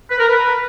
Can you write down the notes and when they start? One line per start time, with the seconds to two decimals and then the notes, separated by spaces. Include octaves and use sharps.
0.11 B4
0.20 A#4
0.29 B4